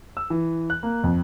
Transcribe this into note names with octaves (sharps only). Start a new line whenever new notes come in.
E6
E3
F#6
A#3
F2